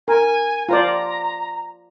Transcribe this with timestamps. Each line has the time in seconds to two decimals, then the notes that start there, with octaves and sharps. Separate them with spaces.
0.08 A#4 G#5
0.69 F4 C5 D5 A#5